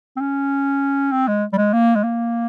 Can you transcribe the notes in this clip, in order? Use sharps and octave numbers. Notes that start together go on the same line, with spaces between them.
C4
C#4
C4
G#3
G3
G#3
A#3
G#3
A#3